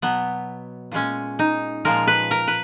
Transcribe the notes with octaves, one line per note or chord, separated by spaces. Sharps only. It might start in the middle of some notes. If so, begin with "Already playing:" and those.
B2 F#3 B3
A#2 G#3 C#4
D#4
A#2 F3 G#3 A#4
B4
A#4
B4